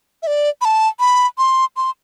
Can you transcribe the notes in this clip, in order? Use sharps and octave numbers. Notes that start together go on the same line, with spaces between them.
E5
D5
B5
A5
B5
C6
C6